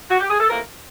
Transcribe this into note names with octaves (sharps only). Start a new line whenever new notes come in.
F#4
G4
G#4
A4
F2 C3 E3 A3 A#3 A#4